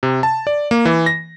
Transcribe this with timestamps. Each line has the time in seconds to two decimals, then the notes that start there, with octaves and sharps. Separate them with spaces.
0.03 C3
0.23 A5
0.47 D5
0.71 A#3
0.85 E3
1.06 A#6